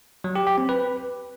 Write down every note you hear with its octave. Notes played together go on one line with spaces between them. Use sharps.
F#3
G4
G4
C4
B4